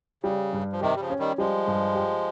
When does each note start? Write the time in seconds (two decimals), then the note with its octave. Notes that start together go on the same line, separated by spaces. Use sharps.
0.24 C#3 G3
0.53 G2
0.73 F3
0.81 C3 D#3 G4
0.96 G3
1.00 C#3 F3
1.10 C#4
1.19 D#3 G3
1.38 F3 G3 G#3
1.67 G2
1.95 G4